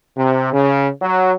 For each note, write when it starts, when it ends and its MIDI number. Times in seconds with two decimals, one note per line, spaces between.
0.17 0.51 48
0.53 0.88 49
1.02 1.33 54